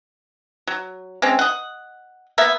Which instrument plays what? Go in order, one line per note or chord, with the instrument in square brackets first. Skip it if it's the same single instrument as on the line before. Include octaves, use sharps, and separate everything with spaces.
[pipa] F#3
G#3 C4 C#4
D#5 F#5
A#3 B3 E5